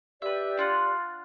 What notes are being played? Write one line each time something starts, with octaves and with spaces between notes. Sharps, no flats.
G4 B4 D5 E5
D4 F4 F#5